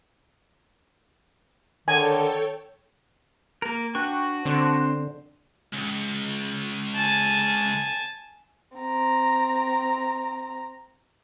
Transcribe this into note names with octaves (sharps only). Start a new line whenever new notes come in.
D3 D#3 A4 C#5 G5 G#5
A#3 A#4
D4 F#4 B4 G5 C#6
D3 C4 D4 C5
C#2
G#5 A5
C4 A#5